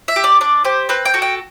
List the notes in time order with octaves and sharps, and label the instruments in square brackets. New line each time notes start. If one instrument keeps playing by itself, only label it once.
[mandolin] E5
G4
D5
D4 D5
G4 C5
C4 B4
G5
F#4 A4
G5